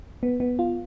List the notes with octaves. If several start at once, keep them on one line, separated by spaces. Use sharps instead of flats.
B3
B3
F4